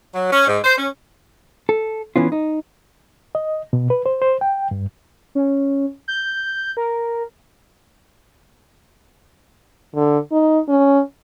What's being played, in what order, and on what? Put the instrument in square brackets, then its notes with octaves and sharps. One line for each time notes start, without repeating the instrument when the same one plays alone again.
[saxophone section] F#3
C#4
G#2
C5
C#4
[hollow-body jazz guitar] A4
E3 B3 C#4 F4
D#4
[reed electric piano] D#5
B2
B4
C5
C5
G5
G2
[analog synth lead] C#4
G6
A#4
[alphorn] D3
D#4
C#4